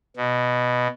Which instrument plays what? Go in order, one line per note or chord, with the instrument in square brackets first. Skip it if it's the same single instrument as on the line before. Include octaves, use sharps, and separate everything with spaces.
[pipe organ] B2